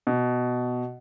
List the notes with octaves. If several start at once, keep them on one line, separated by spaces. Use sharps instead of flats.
B2